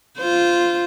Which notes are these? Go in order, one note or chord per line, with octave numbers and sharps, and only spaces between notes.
F4 C5